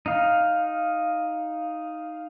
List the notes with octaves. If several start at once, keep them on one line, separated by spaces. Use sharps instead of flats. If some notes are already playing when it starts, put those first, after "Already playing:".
D#4 F5